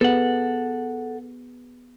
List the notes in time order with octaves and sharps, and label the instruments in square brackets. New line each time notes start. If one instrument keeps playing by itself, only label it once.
[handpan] B3 G#4 [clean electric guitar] A4 F#5